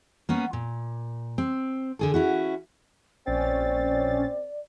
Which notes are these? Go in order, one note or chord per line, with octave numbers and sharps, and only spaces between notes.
A#3 B3 C#4
A#2
C4
D3 G#4 A4
C#4 E4 F#4
A#1 C4 C#4 D5 A6